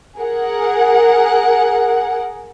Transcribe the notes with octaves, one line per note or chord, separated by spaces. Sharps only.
G#4 A#4 F#5